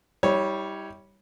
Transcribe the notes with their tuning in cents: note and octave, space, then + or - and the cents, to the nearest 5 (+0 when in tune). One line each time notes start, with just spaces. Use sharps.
G3 +0 E4 -45 C#5 +0